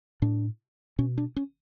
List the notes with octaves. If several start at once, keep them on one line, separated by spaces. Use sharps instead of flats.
A2 D4
B2 C#4
D4
C#4